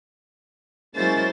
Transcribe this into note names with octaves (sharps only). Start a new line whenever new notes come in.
F#3 G#3 A#3 C#4 E4 C5 A6